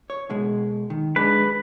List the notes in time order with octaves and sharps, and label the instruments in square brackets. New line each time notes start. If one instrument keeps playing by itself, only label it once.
[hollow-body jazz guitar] C#5
B2 G#3
D#3
[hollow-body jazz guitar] G#3 D4 [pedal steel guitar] B4